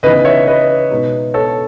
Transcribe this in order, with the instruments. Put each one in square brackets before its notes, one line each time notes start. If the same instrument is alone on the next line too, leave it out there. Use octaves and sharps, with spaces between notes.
[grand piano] C#3 E3 B3 D#4 B4 D#5
C#5 E5
B4 D#5
B2 G#3 B3 D#4
A4 C#5